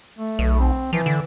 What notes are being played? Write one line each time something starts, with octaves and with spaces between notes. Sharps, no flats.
A3
B1
C4
E3 F3
D3